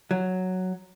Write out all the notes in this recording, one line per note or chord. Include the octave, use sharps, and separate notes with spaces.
F#3